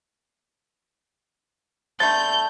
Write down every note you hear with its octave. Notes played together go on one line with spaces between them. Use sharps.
D3 G3 A3 G6 A6